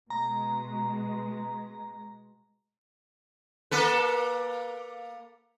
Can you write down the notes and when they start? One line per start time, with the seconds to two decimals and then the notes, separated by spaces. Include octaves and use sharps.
0.10 B2 G#3 A#5
3.71 A#3 A4 B4